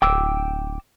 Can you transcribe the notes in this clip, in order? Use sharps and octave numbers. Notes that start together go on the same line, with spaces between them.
D1 G5 D6 E6